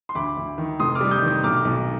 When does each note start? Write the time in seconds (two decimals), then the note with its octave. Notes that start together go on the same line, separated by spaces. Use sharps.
0.09 C6
0.15 D2 B5 D6
0.37 D2
0.58 D#3
0.80 F1 C6 D#6
0.95 D6 F6
1.01 G3
1.11 D#6 G6
1.22 D#3
1.27 D#6 G6
1.43 B1 D6 F6
1.65 B1